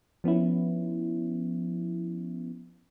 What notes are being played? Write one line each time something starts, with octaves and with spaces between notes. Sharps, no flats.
F3 B3 C#4 E4